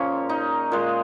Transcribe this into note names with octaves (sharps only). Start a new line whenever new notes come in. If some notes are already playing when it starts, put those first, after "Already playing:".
Already playing: A#2 F3 G#3 A#3 C#4
D#4
A#2 G#3